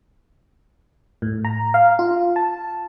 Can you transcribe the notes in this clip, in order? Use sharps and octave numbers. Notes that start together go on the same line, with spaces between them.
A2
A#5
F5
F4
A5